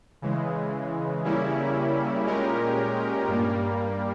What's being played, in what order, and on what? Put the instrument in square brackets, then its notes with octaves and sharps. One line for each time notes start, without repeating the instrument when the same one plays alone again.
[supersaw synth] C#3 E3 G#3
C#3 G3 A#3 C#4 E4
A#2 G#3 C#4 G4 A#4
G2 G3 A#3